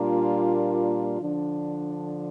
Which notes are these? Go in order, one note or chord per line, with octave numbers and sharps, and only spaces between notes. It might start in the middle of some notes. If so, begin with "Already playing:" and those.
Already playing: A#2 G3 A#3 D4 F4
D3 F3 D4